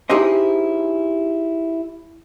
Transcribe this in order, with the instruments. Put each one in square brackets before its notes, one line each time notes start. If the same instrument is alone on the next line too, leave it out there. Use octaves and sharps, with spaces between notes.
[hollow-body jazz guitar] D#4 E4 G4 G#4 C5 D#5